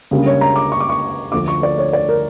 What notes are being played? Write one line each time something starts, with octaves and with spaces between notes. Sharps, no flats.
C#2 C#3 G3 A#3 D4
C#5
A#5
D6
C#6
D6
C#6
D2 D3 F3 A3 D6
C#6
D5
C#5
D5
A#4